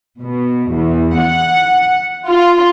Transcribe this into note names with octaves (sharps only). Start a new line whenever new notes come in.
B2
E2
F#5
F4